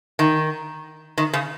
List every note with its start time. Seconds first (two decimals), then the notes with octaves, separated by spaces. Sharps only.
0.19 D#3
1.18 D#3
1.33 C#3